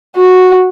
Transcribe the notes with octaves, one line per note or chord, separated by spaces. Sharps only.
F#4